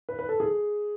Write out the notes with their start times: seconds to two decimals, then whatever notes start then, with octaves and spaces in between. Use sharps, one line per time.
0.09 B4
0.19 B4
0.29 A4
0.40 G#4